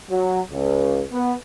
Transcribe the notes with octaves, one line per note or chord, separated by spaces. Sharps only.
F#3
C#2
B3